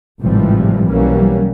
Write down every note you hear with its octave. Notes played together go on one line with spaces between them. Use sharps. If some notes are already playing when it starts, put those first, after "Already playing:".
G#1 A2 C3 E3 F3 G3
B1 E3 F#3 G3 A#3 C#4